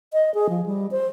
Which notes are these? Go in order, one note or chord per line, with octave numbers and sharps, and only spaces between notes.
D#5
G#4
F3
G3
C5